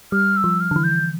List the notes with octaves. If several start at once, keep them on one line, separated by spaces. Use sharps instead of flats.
G3 F6
E6
F3
F6
D3
E3
G6